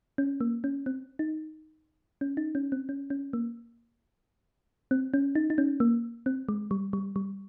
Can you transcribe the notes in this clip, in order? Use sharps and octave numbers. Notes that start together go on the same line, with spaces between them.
C#4
A#3
C#4
C4
D#4
C#4
D#4
C#4
C4
C#4
C#4
A#3
C4
C#4
D#4
D#4
C#4
A#3
C4
G#3
G3
G3
G3